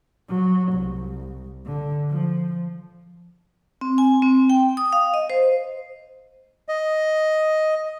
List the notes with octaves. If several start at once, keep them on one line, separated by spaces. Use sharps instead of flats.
F#3
C2
D3
F3
C4
G#5
C4
G5
D#6
F5
D#5
C5
D#5